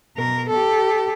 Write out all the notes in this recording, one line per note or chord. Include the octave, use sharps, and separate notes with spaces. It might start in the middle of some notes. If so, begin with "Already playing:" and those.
B2 A#4
G4 A4